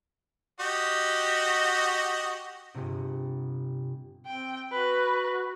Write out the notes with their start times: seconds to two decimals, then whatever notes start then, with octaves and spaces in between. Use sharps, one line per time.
0.60 F#4 G4 D#5
2.75 G1 C3
4.26 C4 G5
4.72 F#4 B4